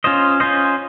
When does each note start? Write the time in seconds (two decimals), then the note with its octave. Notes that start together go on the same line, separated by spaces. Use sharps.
0.04 C#4 F4 C5 D#5
0.40 C#4 F4 C5 D#5